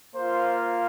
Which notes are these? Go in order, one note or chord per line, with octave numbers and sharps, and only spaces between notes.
A#3 F4 C5